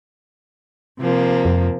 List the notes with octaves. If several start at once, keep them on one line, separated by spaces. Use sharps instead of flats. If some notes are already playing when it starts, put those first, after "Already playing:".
C3 F3 A#3
F2